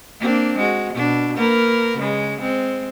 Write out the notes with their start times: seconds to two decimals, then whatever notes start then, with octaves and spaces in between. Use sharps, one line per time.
0.20 A#3 C4 D4
0.57 G#3 F#4
0.93 B2 D4
1.36 A#3 A#4 B4
1.97 C#3 G#3
2.40 G#3 C4